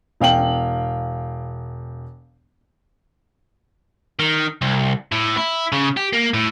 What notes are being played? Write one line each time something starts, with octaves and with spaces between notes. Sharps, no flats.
E1 F5 G5 F#7
D#3
C2
A2
E4
C#3
G4
A#3
A2